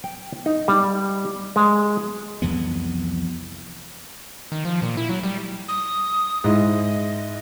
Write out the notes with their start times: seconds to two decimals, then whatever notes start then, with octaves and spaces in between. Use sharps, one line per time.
0.04 G5
0.46 D#4
0.68 G3
1.56 G#3
2.42 C2 F2 E3 B3
4.52 D#3
4.65 F3
4.82 A#2
4.97 E4
5.09 F#3
5.23 G3
5.68 D#6
6.44 G#2 G#3 E4 D#5